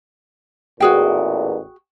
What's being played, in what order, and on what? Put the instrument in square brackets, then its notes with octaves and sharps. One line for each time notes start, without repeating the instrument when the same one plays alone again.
[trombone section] A1 E2 A#2 [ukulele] F#4 G#4 G5